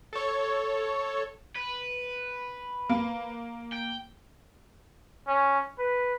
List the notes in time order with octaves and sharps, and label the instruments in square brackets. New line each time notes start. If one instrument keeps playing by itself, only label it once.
[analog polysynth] A4 C#5
[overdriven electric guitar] B4
[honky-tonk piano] A#3
[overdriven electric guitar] G5
[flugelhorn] C#4
B4